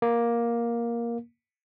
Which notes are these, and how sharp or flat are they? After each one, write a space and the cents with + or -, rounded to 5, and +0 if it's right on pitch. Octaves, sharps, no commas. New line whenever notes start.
A#3 +10